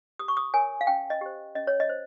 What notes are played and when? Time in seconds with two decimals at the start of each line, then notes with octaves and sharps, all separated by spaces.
0.19 G4 D#6
0.28 C#6
0.37 D#6
0.53 A#4 C#5 G#5
0.81 F5
0.87 C#4 G5
1.10 D#5
1.21 G4 C5
1.55 C#4 D#5
1.67 C#5
1.80 D#5
1.89 C5